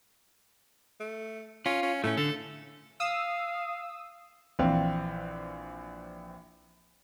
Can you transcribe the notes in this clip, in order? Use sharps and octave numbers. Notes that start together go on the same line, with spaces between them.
A3
C#4 F4
C#4
A2 A3 C#4
D3 A4
F5 D#6 E6
A#1 E3 C4 F5